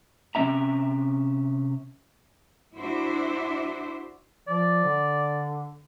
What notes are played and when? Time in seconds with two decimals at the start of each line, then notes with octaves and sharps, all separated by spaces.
0.35 C3 G3 C#4 E5 A#5
2.77 D4 E4 F#4 C5 E5
4.48 F3 D5
4.84 D3